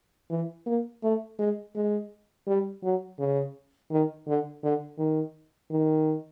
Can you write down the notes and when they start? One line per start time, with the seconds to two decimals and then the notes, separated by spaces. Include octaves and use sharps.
0.30 E3
0.66 A#3
1.03 A3
1.39 G#3
1.75 G#3
2.47 G3
2.83 F#3
3.19 C#3
3.91 D#3
4.27 D3
4.63 D3
4.98 D#3
5.71 D#3